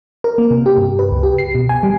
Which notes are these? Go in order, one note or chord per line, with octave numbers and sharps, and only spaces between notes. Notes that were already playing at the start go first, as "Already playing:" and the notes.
A#4
A#3
C3
G4
G2
B4
C#2
G4
C7
B2
G#5
G3